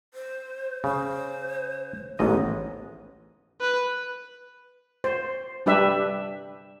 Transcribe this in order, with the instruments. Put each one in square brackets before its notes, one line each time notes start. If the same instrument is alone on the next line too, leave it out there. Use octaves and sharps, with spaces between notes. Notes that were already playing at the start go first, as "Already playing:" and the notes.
[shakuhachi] C5
[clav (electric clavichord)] C#3 [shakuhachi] C5
[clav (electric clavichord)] A1 G#2 D#5 [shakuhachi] B3
[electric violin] B4
[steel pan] C5
G3 D4 G4 B4 E5